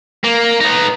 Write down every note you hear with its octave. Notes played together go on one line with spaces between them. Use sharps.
A#3
B3 D#4